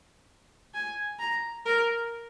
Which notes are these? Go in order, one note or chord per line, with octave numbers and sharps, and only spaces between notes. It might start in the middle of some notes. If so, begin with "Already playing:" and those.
G#5
A#5
A#4